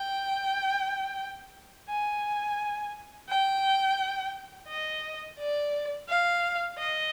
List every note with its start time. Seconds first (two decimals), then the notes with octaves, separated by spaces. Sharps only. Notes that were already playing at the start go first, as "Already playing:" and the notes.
Already playing: G5
1.89 G#5
3.29 G5
4.68 D#5
5.39 D5
6.09 F5
6.79 D#5